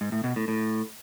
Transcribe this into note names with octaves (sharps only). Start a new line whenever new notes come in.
G#2
A2
B2
A2
A2